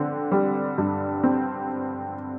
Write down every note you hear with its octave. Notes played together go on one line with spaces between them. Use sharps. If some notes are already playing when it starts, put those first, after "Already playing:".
Already playing: D3 C4
G3
G2
C4